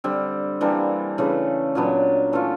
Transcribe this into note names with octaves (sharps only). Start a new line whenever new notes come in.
D3 G3 C4
E3 G3 A#3 D4
C#3 E3 A3 D4
A#2 F#3 B3 D4
E3 A3 C#4 F4